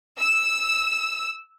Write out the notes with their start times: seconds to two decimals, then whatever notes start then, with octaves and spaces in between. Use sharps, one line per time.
0.19 E6